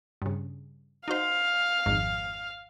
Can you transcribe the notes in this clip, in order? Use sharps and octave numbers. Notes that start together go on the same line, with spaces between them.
G2 C#3
D#4 F#4 C5 F5
G#1 F2 G#2